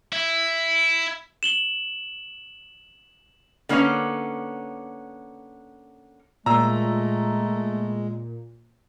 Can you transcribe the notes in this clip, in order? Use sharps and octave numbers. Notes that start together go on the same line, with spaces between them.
E4
E7 F#7 G7
D3 A#3 B3 C#4 F5
A#2 G#3 A3 A#5 E6